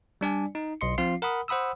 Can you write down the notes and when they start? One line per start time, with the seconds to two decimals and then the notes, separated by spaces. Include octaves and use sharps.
0.21 G3 D4 D5 G#5
0.55 D#4
0.81 B1 D#5 C6 C#7
0.98 F3 C4 F4 F5 C7
1.22 A#4 F#5 B5 D#6
1.48 C5 F#5 B5 D#6 E6